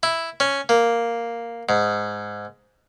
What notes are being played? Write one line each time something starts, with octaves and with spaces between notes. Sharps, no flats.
E4
C#4
A#3
G#2